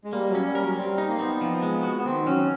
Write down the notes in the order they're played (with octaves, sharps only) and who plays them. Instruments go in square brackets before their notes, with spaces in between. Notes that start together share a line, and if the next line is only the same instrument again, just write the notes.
[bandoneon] G#3
[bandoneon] G3 [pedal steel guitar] A#3
[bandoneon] F#3
[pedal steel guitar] C#4
[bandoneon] G3
[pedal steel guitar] A#4
[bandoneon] F#3
[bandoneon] G3 [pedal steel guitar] C4
[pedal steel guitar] D#4
[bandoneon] A#3
[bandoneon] B3 [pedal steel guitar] C4
[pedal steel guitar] F3
G#3
F#4
[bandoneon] B3
[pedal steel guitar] D#3 [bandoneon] C4
[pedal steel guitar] F#3 [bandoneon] C#4